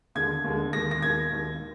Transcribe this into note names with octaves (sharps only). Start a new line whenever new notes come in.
D#2 D3 G#3 G#6
D#2 D3 G#3
D#2 D#3 G#3 A#6
A#6
D#2 D#3 G#3 G#6
D#2 D#3 G#3